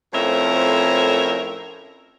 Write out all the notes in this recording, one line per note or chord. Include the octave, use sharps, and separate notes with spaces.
F2 A2 C#4 A#4 C5 E5